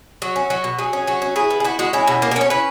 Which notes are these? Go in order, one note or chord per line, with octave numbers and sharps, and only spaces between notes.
F#3 F#4
C#4
F#3 F#4
B2
F#3 G#4
C#4
F#3 F#4
C#4
E4 G#4
B3
G#4
E4 F#4
G#3 F#4
C#4 E4
B2
A#3
A#4
C#4 C#5
E4 B4